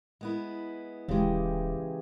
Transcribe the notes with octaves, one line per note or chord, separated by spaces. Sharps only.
G#3 B3 E4
D#1 C#3 E3 G#3 G4